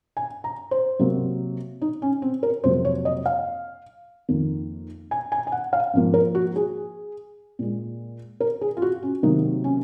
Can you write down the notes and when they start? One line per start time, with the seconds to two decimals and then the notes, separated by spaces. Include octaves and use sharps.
0.17 G#5
0.44 A#5
0.71 C5
0.99 C3 F#3 A#3
1.82 D#4
2.02 C#4
2.22 C4
2.43 A#4
2.64 F2 C3 F#3 A#3 C5
2.85 C#5
3.05 D#5
3.26 F5
4.29 F2 D#3 A#3
5.11 G#5
5.32 G#5
5.47 G#5
5.52 F#5
5.73 F5
5.94 G#2 F3 A#3
6.14 A#4
6.35 F#4
6.56 G#4
7.59 A#2 G#3
8.40 A#4
8.61 G#4
8.77 F4
8.82 F#4
9.03 C#4
9.23 C3 D#3 F#3 A#3 D#4
9.64 C#4